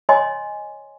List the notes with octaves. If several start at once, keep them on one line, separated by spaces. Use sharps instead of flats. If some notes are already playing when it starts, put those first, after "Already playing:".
C#5 D#5 G#5 C6